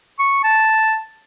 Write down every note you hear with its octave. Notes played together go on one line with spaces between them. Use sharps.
C#6
A5